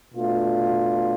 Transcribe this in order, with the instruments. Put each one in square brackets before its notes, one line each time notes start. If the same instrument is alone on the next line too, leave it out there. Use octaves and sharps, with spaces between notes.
[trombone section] B2 A3 D4 F4